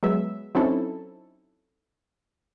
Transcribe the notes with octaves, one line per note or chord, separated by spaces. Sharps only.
F#3 G#3 B3 E5
F#3 C4 C#4 D#4 E4 A4